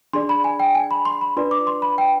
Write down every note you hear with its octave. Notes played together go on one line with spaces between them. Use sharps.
D4 G#4 D5 C6
B5
G#5
G5
G#5
B5
C6
B5
D4 F4 B4 D5 C6
D6
C6
B5
G5